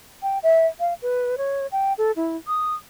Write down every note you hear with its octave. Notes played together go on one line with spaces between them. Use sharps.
G5
E5
F5
B4
C#5
G5
A4
E4
D#6